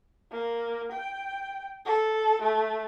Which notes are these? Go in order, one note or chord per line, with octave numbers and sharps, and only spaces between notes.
A#3
G5
A4
A3